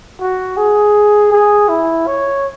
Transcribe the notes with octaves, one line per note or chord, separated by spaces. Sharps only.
F#4
G#4
G#4
E4
C#5